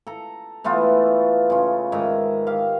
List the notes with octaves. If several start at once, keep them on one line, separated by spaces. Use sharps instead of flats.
A4 A#5
E3 A3 B3 F4
C#3 F4
G#2 D#3 E5 A#5
G4 F5